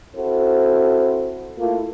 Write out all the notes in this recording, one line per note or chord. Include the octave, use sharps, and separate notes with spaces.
C4 E4 F#4 A4 C5
A3 A#3 E4 F4